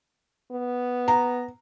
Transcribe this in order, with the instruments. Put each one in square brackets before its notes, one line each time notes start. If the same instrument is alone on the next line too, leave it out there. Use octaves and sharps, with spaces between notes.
[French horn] B3
[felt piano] A#5